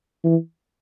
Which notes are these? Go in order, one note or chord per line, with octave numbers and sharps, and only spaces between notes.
E3